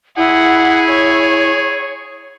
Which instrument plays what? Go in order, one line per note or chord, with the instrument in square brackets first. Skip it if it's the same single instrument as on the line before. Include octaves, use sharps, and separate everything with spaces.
[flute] E4 [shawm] G#4 [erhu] F#5
[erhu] C#5